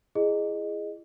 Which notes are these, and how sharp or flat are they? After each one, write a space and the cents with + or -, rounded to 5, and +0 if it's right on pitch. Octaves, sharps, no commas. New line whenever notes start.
E4 +30 G#4 +0 D#5 -15